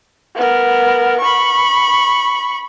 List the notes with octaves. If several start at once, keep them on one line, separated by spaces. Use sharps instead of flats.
B3 A#4
B5 C#6